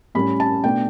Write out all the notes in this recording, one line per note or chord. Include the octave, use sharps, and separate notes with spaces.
A2 G3 C#4 B5
A5
B2 A3 D4 G5